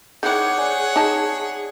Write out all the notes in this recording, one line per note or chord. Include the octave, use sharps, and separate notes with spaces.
D#3 E4 G#4 C#5 F#5 D6 F#6 G6
D5 G#5
D#4 A5